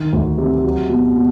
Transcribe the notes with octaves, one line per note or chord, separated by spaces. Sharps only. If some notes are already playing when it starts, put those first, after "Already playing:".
Already playing: D#3
D2
C3
F#3
B2
B2